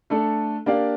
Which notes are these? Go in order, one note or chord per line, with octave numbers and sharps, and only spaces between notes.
A3 D4 A4
A#3 D4 G4 D5 F5